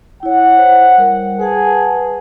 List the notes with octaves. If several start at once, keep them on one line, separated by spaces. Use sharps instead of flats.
E4 C#5 F#5
C5
G3 A#4
G#4 B4 F#5 A5